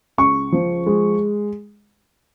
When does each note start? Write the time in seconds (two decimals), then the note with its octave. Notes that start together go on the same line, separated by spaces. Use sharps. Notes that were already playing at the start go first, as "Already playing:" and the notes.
0.18 C#2 C#6
0.52 F3
0.86 G#3